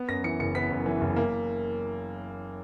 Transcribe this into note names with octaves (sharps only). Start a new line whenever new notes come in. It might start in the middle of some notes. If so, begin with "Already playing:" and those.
Already playing: B3
F#2 A#6
E3 C#7
F#1 C#7
B3 B6
F#2
E3
F#1
A#3